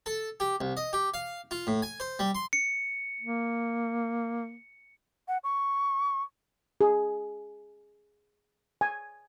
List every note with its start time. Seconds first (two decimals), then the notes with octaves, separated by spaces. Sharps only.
0.06 A4
0.40 G4
0.61 C2
0.77 D#5
0.93 G4
1.14 F5
1.51 F4
1.67 A2
1.82 G#5
2.00 C5
2.19 G3
2.35 C6
2.53 C#7
3.21 A#3
5.28 F#5
5.44 C#6
6.81 G#4
8.81 G#5